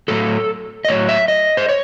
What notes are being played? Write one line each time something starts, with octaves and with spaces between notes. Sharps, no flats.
A2 F#3 A4
D#5
A2 F#3 C#5
E5
D#5
C5
C#5